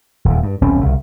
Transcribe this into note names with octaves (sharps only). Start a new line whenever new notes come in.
D#1 E2
G2
D#1 B1 C4 C#4
C2 C#3